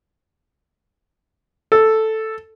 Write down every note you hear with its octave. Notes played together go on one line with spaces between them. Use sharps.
A4